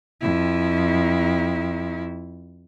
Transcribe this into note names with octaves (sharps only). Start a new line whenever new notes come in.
F2 E4